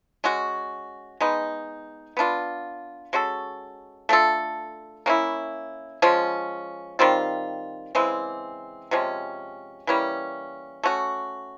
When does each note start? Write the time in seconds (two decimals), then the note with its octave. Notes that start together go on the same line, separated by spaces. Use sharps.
0.24 G#3 C#4 F#4
1.21 G#3 B3 D#4
2.17 B3 D4 F4
3.13 G#3 C#4 F#4 A4
4.09 A3 D4 F4 A4
5.06 A#3 C#4 E4
6.02 F3 G#3 C#4
6.99 D#3 G3 C4 F4
7.95 C#3 E3 G#3 C4
8.91 C3 F3 G#3 C#4
9.87 E3 G3 A#3 C#4
10.84 A3 C#4 F#4